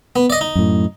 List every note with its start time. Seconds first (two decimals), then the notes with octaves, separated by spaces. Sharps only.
0.16 B3
0.30 D5 D#5
0.41 D#4
0.55 F#2 A2